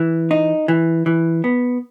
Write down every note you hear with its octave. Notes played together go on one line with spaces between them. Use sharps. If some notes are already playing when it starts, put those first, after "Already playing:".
Already playing: E3
D#4
E3
E3
B3